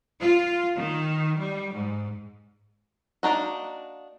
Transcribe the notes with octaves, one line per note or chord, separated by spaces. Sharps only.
F4
D#3
G3
G#2
A#3 D4 D#4 F#4